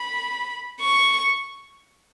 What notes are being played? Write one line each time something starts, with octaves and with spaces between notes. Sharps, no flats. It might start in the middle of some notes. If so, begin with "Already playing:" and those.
Already playing: B5
C#6